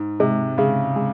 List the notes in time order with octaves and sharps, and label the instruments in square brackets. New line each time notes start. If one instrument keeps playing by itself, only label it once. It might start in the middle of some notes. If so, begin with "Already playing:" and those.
Already playing: [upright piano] G#2
[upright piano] C3 [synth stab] G#3
[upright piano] C#3 [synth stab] G#3
[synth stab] G#3